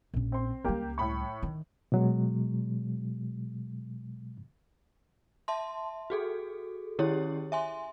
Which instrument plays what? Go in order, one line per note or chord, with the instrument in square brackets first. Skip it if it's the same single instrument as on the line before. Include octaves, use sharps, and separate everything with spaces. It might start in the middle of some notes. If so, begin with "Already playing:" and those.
[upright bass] A#1 C#4
[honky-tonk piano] C4 C6
[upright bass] C#2 G3 [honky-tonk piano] A#3 G4
[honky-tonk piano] A2 B5 C#6
[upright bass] D#3
[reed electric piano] B2 F#3 G#3
[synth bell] E5 A5 C6
F#4 G#4 A4
D#3 C#4 E4 G4 G#4 C#5
E5 G#5 C6